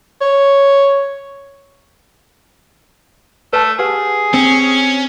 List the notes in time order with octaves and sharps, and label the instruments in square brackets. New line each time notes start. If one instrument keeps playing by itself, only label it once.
[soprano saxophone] C#5
[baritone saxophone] A3 [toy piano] B4 A5
[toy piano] G4 B4 F#5 [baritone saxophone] G#4
[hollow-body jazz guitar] C4 [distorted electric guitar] C#4